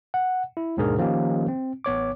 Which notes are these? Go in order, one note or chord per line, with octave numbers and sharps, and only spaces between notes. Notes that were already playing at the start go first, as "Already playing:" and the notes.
F#5
E4
D#2 G#2 B2 D4 G#4 A#4
D#3 F3 A#3 C#4 D#4 G4
C4
A1 B3 C#5 D6